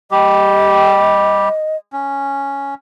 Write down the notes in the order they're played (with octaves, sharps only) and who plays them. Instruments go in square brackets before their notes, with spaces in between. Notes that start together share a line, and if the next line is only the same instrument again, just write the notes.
[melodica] G3 G4 [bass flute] D#5
[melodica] C#4